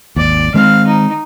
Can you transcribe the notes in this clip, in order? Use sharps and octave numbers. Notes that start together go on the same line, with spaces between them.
G#1 D#2 D5
D#3 G#3 C4 F5
D#4